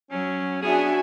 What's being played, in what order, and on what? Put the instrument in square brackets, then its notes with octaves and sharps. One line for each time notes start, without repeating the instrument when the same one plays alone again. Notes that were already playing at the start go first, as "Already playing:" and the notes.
[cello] F#3 [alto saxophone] C#4
[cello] B3 D4 [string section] F#4 E5 G#5 [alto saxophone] G#4